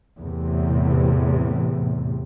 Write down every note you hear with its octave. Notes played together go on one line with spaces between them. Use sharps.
E2 A2 C3